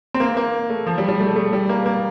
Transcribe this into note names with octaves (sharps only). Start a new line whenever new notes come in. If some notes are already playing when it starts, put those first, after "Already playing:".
C4
A#3
A#3
A3
F3
G3
G3
A3
A3
G3
A#3
A#3